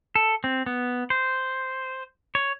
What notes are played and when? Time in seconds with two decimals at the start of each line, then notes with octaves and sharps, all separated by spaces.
0.15 A4
0.44 C4
0.66 B3
1.10 C5
2.35 C#5